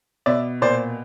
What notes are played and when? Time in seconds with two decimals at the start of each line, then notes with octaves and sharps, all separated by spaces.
0.26 B2 D5 E5
0.62 A#2 C5 D5